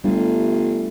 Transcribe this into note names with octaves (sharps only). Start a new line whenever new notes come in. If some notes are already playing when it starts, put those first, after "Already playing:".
G1 G3 A3